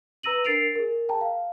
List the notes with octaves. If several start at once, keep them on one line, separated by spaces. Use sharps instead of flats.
B4 A#5 E6 A#6 D#7 F#7
D4 A#4 A6 C7 D7 F7
G#4 A#4
G5 A5 A#5
F5